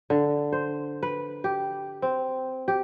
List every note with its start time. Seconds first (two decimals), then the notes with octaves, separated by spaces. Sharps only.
0.10 D3
0.52 C5
1.03 B4
1.44 G4
2.02 C4
2.68 G4